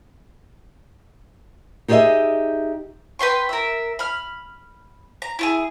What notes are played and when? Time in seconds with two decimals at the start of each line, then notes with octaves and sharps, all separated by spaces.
1.88 D#4 G4 G#4 C#5 D#5 E5
3.19 B4 G5 C6 C#6
3.49 A#4 E5
3.99 B5 F6
5.22 A#5
5.39 E4 F4 G#4